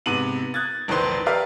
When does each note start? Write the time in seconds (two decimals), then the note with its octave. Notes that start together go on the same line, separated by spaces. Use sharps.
0.06 G#2 C3 B3 D#7 F#7
0.54 D#6 F#6 G#6 A6
0.88 E1 A#1 D#3 B4 C5 C6
1.26 G4 A#4 B4 D5 E5 F5